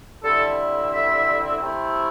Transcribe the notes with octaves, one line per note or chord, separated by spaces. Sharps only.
D3 G3 C4 E4 A4
E5
C3 A3 C4 E4